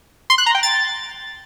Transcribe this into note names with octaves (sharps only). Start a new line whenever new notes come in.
C6
F#6
A#5
G5
A6